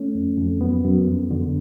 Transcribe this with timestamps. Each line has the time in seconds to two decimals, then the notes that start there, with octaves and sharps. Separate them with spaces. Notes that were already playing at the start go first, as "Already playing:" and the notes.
Already playing: A3 C#4
0.15 F2
0.38 F2
0.61 F#2 B3
0.84 F#2
1.08 F2
1.31 D3